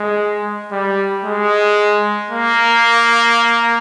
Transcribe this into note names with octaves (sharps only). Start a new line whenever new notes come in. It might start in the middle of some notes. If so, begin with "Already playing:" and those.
Already playing: G#3
G3
G#3
A#3